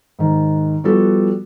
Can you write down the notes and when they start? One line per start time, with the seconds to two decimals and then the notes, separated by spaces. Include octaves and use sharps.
0.19 G#2 D#3
0.84 F3 G3 B3 F#4 A4